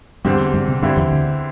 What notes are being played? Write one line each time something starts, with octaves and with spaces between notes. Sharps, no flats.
E2 G2 D3 G3 C4 G4
G2 G3
C3 C4
G2 D3 G3 C4 E4 G4
E2 E3
D2 D3